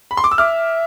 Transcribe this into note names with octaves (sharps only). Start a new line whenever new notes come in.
B5
C6
D6
E6
E5 D6 F6